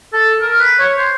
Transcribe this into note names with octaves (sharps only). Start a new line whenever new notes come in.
A4
A#4
B4
C#5
C5